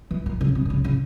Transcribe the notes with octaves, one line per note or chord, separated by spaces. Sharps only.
E3
D#3
C#3
C3
D3
C#3
C#3